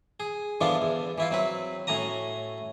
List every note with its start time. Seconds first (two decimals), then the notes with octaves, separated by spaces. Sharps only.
0.20 G#4
0.61 D3 E3 F3 B3 D4 F4
0.82 E2
1.18 E3 E4 F4
1.31 F#3 C4 B4
1.87 A2 C#4 F#4 A#5 D#6